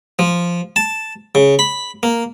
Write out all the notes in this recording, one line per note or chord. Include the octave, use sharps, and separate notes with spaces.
F3
A5
C#3
B5
A#3